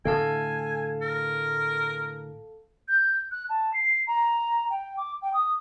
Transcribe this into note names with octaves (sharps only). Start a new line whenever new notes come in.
A2 D3 A3 A4 F5 G#5 A5
A#4
G6
F#6
A5
C7
A#5
G5
D6
G5
D#6